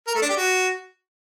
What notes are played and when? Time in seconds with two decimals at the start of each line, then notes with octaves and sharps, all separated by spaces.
0.07 A#4
0.15 A3
0.22 D4
0.29 G4
0.37 F#4